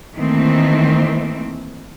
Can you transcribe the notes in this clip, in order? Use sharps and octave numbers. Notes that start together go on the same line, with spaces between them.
D#3 E3 A3 A#3 C4